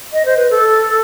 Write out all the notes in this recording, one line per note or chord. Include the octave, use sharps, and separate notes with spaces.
D#5
C5
B4
A4